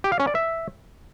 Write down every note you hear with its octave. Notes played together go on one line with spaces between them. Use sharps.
G4
F5
C#4
D5
E5